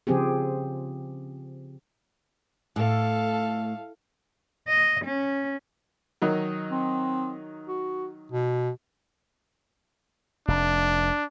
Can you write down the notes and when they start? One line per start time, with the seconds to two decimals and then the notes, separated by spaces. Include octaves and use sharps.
0.07 C#3 F3 C4 G4 G#4
2.76 A2 A4 F5
4.68 D#5
5.05 C#4
6.22 D#3 F#3 D#4
6.71 C4
7.67 F#4
8.32 B2
10.48 F1 D4